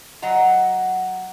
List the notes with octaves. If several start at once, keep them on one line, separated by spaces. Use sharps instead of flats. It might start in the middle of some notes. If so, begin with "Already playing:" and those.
F#3 D#5 F#5 A#5